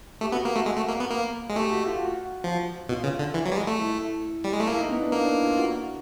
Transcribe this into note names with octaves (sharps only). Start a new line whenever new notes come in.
A3 G4
B3 F#4
A#3
A3 F#4
G#3
A3
A#3
B3
A#3
G#3
A3 G4
F#4
F4
F#4
F3
B2 F4
C#3
D3
E3
F#3
G3
G#3
A3
E4
G3
G#3
A3
A#3 E4
D#4
B3
D4
A#3
D4
E4
F4
F#4